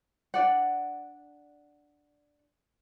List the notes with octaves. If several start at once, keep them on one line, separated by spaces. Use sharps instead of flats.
D4 F4 D5 F#5